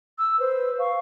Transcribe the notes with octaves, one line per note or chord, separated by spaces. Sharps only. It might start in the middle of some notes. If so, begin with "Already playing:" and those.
E6
B4 C5
F5 C#6